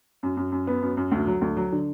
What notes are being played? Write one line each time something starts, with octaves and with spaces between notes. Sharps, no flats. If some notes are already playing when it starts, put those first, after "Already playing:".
F#2
F#2
F#2
B3
F#2
F#2
D2
F#3
D2
F#3
D3